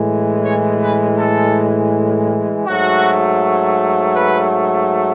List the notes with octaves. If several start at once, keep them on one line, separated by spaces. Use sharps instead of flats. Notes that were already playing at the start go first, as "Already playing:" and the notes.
Already playing: A2 E3 G#3
C#5
B4
A4
G#2 F#3 A3 F#4
B4